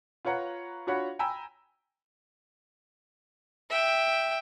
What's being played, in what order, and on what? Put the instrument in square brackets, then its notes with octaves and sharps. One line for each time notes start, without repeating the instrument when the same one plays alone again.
[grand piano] F4 B4 C#5 F#5 A#5
D4 F4 F#4 C#5 F#5 B5
G5 G#5 A#5 B5 E6
[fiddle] E5 G5